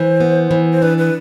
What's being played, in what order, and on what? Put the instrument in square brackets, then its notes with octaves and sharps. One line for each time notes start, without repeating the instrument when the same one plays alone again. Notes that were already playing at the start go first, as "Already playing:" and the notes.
Already playing: [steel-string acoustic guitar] E3 [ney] C5
[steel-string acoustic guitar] B3
E3
[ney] C5
[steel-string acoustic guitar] D4 [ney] B4
[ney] B4